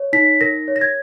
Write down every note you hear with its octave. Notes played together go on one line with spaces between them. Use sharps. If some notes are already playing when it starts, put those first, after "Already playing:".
Already playing: C#5
D#4 B6
A#4 A#6
C#5
A#6
G#6